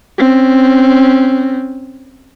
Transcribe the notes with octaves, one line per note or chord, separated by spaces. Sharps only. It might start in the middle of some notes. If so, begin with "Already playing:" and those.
C4 C#4